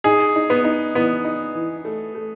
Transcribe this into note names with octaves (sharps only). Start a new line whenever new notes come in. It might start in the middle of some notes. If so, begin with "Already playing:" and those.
D#4 G#4
D#4
B3
D#4
E3 B3
D#4
E3
A3
A3